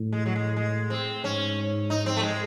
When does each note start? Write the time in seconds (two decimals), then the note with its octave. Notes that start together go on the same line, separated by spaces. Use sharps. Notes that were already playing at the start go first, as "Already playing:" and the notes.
Already playing: A2
0.13 G#3
0.26 F#3
0.36 G#3
0.57 G#3
0.90 C4
1.24 G#2 C#4
1.90 D#4
2.06 C4
2.17 A3
2.23 G#3